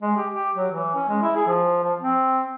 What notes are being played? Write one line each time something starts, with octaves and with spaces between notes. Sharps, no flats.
G#3
G4
G4
F#3
E3
C#4
G#3
E4
G#4
F3
F3
C4